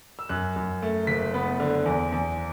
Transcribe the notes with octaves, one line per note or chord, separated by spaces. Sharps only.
E6
F#2 F#6
F#2
A3
F#1 B6
B3
D3
E2
E2